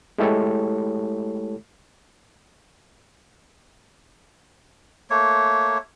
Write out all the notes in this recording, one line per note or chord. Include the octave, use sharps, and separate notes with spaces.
G#3 A3 E4 G4 A4 C#5
A3 A#3 C#5